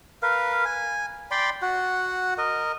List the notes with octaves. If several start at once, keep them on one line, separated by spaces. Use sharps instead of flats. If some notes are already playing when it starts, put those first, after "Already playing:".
A#4 B4 F5
G#5
D5 G5 B5 C6
F#4 F#5
A#4 D#5